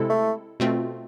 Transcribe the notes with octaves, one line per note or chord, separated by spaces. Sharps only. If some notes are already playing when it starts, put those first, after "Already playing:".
Already playing: C3 G#3 C4 E4 A4
A3
B2 A3 C4 F4